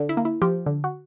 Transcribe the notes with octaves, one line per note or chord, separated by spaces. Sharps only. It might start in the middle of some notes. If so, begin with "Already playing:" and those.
Already playing: D3
E4
A#3
E4
F3 G4
D3
F#4